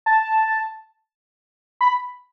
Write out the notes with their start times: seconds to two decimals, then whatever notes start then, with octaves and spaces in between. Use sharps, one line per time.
0.06 A5
1.81 B5